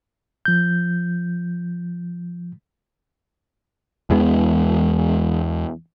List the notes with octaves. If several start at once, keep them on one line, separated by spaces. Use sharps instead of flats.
F3 G6
E2 E3 G#3 B3